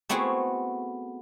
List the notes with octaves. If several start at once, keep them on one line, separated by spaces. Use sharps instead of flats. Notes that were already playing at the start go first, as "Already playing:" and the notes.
A3 B3 C4 E4 F#4 G#4